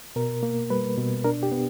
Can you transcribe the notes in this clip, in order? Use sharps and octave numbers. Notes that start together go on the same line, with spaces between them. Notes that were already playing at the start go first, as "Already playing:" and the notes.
B2 A#4
A#3
G3 B4
B2
D4 A#4
G4
B3